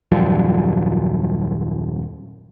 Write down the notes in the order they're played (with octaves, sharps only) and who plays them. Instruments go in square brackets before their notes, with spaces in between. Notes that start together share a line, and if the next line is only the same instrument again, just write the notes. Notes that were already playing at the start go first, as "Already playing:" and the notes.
[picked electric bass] D#1 F#2 F3 G3